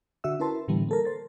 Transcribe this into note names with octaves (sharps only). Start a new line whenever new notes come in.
D3 F#4 E5 E6
C#4 E4 A#4 B4 A5 C6
A2 D3 E3 G3 B3
A#3 A4 A#4
C5 A6